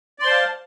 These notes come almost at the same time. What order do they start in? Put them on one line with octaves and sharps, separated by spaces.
D5 C6 C5 A5 F5